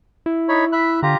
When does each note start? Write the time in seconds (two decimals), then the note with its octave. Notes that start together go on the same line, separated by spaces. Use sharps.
0.26 E4
0.49 D#4 C#5 B5
0.72 E5 B5 F#6
1.03 D3 F4 G4 A#5